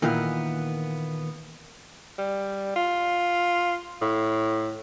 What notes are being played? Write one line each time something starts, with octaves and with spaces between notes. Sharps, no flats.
A#2 D#3 E3 A#3 B3
G3
F4
A2